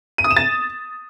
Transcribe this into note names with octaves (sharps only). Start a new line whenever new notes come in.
D#7
D#6
E7
A6